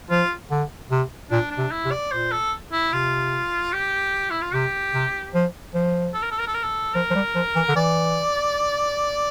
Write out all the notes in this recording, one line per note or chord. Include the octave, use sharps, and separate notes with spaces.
F3 F4
D3
C3
A#2 D4
D4
C3
E4
C3
D5
A#2 C5
A4
E4
C3 F4
G4
E4
F4
C3 G4
C3
F3
F3
A4
A#4
A4
A#4
A4
A#4
A4
F3 A#4
F3
G3
F3
E3
D3
E3 D5